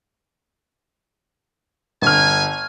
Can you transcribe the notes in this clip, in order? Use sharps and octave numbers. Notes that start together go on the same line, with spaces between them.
G1 G#5 F6